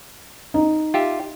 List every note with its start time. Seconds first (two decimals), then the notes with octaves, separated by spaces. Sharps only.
0.54 D#4
0.94 F4 G4 E5